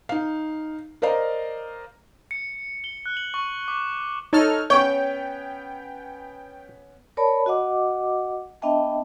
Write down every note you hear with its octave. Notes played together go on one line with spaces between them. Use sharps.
D#4 F5
A#4 C5 D5 D#5 F5 A#5
C#7
G7
F#6
F#7
C#6
D6
D#4 A4 C#5 D#5 F6
B3 C#4 C#5 G5
A#4 C#5 D5 A5 B5
F#4 D#5 F#5 D6
B3 D4 D#5 E5 G5 A5